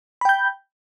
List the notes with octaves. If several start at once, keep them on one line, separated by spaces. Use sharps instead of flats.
G5 B5 G6